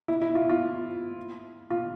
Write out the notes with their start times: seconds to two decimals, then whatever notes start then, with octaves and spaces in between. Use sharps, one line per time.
0.08 E4
0.22 E4
0.35 F4
0.49 F4
1.70 F4